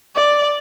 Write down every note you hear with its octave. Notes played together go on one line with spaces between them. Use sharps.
D5